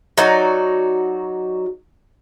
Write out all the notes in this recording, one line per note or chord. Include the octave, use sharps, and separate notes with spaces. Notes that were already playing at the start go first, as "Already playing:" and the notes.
F#3 D#4 F#4 D5